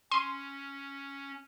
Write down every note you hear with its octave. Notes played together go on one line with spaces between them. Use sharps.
C#4 C6 D#7